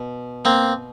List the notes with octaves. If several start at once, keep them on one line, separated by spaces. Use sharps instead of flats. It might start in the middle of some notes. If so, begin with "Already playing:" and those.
Already playing: B2
A#3 C4